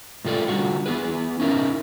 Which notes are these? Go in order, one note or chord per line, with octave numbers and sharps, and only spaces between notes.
A2 C3 F4 A4 D5
D3 G3 F4 F#4
B3 E4 G#4 B4
C#4 D#4 E4 A#4